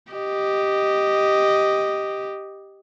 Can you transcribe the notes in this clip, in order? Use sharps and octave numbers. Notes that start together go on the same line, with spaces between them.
G4 D#5